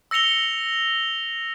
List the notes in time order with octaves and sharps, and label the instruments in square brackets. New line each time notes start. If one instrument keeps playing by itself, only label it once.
[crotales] E6 A#6 C#7 F7 G7